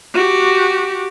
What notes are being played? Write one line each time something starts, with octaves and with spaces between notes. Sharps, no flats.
F#4 G4